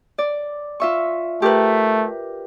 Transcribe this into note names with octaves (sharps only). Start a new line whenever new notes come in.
D5
F4 E5 C#6
A3 G4 A#4 B4